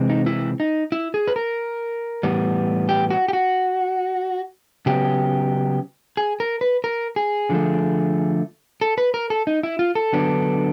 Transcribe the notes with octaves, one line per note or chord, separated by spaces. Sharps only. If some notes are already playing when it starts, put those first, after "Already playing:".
Already playing: C3 E3 G#3 C4
D#4
E4
D#4
E4
G#4
B4
A#4
A2 E3 G3 B3
G4
F#4
G4
F#4
C#3 F#3 B3 G4
G#4
A#4
B4
A#4
G#4
D3 F3 A3
A4
B4
A#4
A4
D#4
E4
F4
A4
D3 F#3 B3 D4